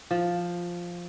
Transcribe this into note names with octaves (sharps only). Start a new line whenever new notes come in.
F3